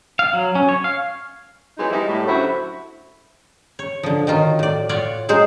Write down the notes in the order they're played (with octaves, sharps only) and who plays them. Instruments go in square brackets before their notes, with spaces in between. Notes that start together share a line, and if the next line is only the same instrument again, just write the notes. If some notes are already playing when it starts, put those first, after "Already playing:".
[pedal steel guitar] F5
F#3
C#4
C#5
F5
[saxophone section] E3 F#3 G#3 B3 C4 D#4
G3 G#3 D#4 E4
A2 G3
F#2 D3 E4 F#4 C5
[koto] C#5
D3 F3
D#3 F#3 F4
A2 D5
F4 C#5 D5 F#5
F#3 G#3 C5